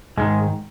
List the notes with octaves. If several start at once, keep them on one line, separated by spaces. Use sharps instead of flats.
G#2 D#3 G#3